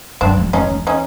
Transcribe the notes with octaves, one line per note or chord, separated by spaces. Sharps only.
F#2 C4 D4
F2
F2 C#4 D#4
E2
C#4 D#4